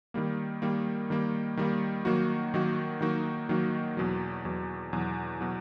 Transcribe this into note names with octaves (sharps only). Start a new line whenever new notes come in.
D#3 G3 A#3
D#3 G3 A#3
D#3 G3 A#3
D#3 G3 A#3
D#3 F#3 A#3 D#4 F#4
D#3 F#3 A#3 D#4 F#4
D#3 F#3 A#3 D#4 F#4
D#3 F#3 A#3 D#4 F#4
E2 B2 F#3
E2 B2 F#3
E2 B2 F#3
B2 F#3